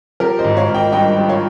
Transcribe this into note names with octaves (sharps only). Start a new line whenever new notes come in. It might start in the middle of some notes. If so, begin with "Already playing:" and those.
F3 G4 A#4
C5 D#5
G#1
C#5 F5
G#1
D#5 G5
G2 D#5 G5
F3
C#5 F5